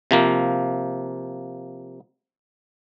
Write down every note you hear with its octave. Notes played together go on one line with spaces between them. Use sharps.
C3 F3 A#3